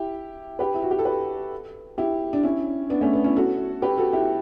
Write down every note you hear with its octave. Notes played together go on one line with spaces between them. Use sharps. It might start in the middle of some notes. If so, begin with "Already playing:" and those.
Already playing: E4 G4
G4 B4
E4
F#4
G4
A4
G4 B4
E4 G4
D4
C#4 E4
B3 D4
A3 C#4
B3
C#4 E4
F#4 A4
G4 B4
F#4 A4
E4 G4